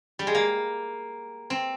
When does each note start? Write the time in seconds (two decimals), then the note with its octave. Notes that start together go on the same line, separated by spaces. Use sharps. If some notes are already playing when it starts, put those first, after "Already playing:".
0.19 G3
0.27 G#3
0.35 A#3
1.50 C4